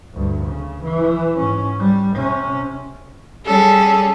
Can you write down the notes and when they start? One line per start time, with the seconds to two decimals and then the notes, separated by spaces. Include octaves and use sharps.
0.13 D2 G2
0.44 C#3
0.83 E3
1.36 G#2 C#4
1.79 G3
2.14 C3 C#4
3.45 G3 C#4 G#4 A4